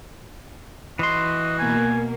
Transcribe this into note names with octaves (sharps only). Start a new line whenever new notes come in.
E3 F#4 D#5 C6
B2 A#3 G#5